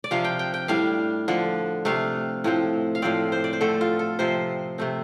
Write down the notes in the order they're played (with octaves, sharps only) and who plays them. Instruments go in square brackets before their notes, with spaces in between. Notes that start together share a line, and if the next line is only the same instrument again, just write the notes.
[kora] D5
C3 F3 D4 F5
G5
G5
G5
A2 G3 D4 F5
D3 F3 D4
C3 A3 D4 F5
A2 F3 C4
F5
A2 F3 C4 D5
C5
D5
C5
D3 A3 C4 A4
F4
A4
C3 F3 C4 C5
C3 A3 C4